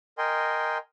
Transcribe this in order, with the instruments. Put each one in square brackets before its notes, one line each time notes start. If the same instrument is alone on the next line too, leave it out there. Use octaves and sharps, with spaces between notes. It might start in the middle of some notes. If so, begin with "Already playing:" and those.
[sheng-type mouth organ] A#4 D#5 G5 G#5 C6